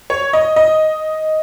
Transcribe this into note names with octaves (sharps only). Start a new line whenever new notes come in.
C#5
D#5
D#5